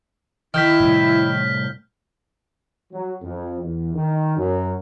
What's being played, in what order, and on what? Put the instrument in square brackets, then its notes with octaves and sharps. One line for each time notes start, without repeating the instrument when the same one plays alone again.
[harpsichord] D#3 [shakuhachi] E4 [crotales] F6 G6 B6
[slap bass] A2 C3 G3
[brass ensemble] F#3
F2
E2
D#3
F#2